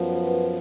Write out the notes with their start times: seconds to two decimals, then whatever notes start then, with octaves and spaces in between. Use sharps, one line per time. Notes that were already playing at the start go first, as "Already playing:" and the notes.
Already playing: F#2 F3 B3
0.14 B4